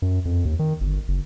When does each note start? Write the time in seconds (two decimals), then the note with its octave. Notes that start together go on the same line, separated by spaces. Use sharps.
0.02 F#2
0.25 F2
0.45 D#2
0.59 D#3
0.81 G1
1.08 F#1